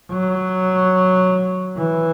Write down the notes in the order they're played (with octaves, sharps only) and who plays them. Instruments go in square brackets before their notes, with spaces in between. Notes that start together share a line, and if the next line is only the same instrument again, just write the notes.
[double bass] F#3
E3